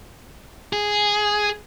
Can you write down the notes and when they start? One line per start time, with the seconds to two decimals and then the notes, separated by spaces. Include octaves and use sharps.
0.73 G#4